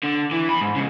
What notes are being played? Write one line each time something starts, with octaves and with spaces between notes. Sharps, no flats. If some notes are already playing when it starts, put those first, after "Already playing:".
D3
E3
E2 B5
G#2
G#2 C#3